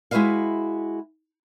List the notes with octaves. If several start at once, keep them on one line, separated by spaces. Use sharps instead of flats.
G#3 E4 F#4 B4 E5 F5